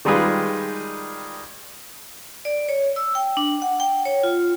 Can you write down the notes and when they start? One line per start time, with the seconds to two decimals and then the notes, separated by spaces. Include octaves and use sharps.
0.05 D#3 G3 G#3 F4 G#4 B4
2.45 D5
2.69 C#5
2.96 E6
3.15 G5
3.37 D4
3.62 F#5
3.80 G5
4.05 C#5
4.23 F4